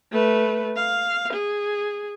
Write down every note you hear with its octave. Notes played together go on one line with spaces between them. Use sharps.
A3 B4
F5
G#4